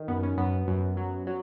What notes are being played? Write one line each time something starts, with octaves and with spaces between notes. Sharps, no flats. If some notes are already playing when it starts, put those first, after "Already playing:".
Already playing: D#3
F#2 B3
C#4
F#2 B3
F#2
F#3
F#3